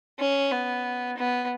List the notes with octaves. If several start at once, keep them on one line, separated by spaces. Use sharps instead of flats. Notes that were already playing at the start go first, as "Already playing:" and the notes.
C#4
B3
B3